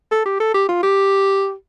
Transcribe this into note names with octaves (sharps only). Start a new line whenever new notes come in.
A4
G4
A4
G4
F4
G4